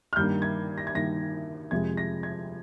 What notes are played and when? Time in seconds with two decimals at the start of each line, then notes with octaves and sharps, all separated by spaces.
0.13 F6
0.16 G2 D#3 A#3 G6
0.42 G#6
0.78 A#6
0.87 G#6
0.94 G2 D#3 A#3 A#6
1.71 F2 C3 F3 G#3 G#6
1.97 A#6
2.23 G#6